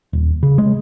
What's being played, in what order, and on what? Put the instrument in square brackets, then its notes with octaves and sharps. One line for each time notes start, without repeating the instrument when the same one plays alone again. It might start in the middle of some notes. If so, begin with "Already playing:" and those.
[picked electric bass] D#1
C#3
G#3